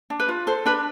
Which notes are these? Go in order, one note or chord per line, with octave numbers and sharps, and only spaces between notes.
D4
B4
F4
A4 C5
D4 B4